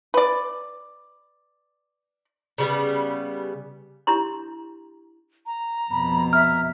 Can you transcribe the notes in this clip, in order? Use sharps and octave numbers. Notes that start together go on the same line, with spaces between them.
B4 D5
C#3 G3 B3
D4 E4 G4 A#5 C6
A#5
F2 B2 B5
E5 F6